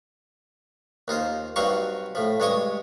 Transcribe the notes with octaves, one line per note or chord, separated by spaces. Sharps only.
D#2 D#4 F4 C5
G2 F#3 C4 D#4 F5 C#6
A2 F3
G2 G#3 C#5 D#5 C#6 D#6